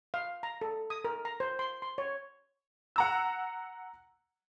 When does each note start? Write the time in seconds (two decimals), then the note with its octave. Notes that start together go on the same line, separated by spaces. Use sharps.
0.14 F5
0.43 A#5
0.61 A4
0.90 D#6
1.05 A#4
1.25 A#5
1.40 C5
1.59 C6
1.82 C6
1.98 C#5
2.96 F#5 A#5 E6